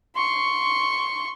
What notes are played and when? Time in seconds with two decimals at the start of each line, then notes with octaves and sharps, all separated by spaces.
0.16 C6 C#6